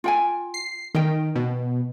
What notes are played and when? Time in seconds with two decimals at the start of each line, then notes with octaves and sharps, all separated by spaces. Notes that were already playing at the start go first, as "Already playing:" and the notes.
0.04 F4 G5 G#5
0.54 C7
0.95 D#3 D#5 G5
1.36 B2